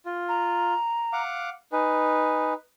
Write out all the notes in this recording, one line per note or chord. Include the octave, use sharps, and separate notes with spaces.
F4
A#5
F5 F#5 D6
D#4 B4 G#5